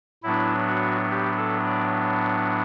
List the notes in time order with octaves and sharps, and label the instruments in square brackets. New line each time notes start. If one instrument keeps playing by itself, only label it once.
[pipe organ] A2 F#3 B3 D4 E4
F#4
G4
A4
D5